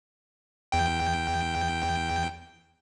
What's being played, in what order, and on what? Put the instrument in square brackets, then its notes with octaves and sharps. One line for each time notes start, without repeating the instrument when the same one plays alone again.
[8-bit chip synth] E2 G5